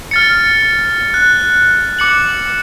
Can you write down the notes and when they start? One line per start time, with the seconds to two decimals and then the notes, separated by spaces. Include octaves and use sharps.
0.11 F6 A6 C#7
1.14 F#6
1.99 D6 C#7 F#7